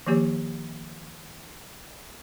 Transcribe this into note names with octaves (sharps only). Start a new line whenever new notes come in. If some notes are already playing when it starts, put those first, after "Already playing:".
D#3 F3 A#3 G4 C#5